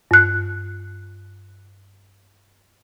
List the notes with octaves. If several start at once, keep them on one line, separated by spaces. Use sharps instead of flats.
G2 F#6